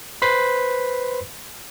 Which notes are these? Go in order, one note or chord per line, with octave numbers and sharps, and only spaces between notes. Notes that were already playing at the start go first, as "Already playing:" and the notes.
B4 C5 B5 C6 B6 C7